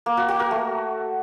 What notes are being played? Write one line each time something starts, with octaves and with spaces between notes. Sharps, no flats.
A#3
F#4
F#4
A#4
A3